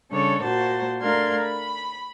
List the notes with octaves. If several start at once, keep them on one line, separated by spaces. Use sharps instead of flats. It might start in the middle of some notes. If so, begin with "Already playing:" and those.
C#3 G3 D4 A4 C#5
A#2 A#3 F#4 C5 A5
A3 D4 A#4 F5 C6 G#6
B5